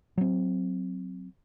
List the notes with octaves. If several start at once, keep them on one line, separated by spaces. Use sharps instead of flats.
F#3 C4